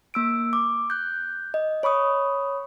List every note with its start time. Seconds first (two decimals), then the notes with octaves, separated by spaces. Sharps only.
0.14 A#3 E6 D7
0.53 D6
0.90 F#6 G6
1.54 D#5
1.83 C#5 B5 C#6 D#6